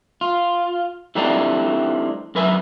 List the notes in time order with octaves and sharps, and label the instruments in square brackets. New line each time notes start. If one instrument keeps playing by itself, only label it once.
[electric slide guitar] F4
E3 G3 A3 C4 D4 D#4
F#2 A#4 B4 E5 G#5